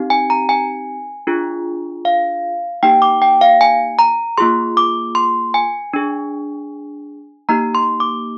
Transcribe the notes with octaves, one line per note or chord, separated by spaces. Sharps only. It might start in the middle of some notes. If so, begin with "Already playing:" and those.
Already playing: C4 D#4 G4
G#5
A#5
G#5
D4 F4 G#4
F5
A#3 D#4 G4 G5
D6
G5
F5
G#5
A#5
A#3 F4 G#4 C6
D6
C6
G#5
D4 G#4
A#3 D#4 G4 A#5
C6
D6